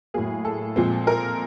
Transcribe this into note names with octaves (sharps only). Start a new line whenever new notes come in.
A2 F#3 A#3 G#4
A4
A#2 F3 G#3 C4
A#4